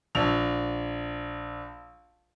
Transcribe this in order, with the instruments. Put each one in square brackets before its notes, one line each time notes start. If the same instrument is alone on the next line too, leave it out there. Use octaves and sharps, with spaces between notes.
[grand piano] A#1 F7